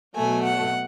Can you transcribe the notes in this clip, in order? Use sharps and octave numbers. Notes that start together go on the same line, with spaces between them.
B2 F#3 A3 G#5
F#5